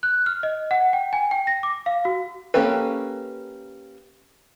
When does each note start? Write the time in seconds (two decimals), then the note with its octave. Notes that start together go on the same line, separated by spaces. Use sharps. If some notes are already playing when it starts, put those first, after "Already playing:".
0.03 F#6
0.26 F6
0.43 D#5
0.71 F#5
0.93 G5
1.13 G#5
1.31 G5
1.47 A#6
1.63 D6
1.86 F5
2.05 F#4
2.54 A#3 C#4 G4 A4 B4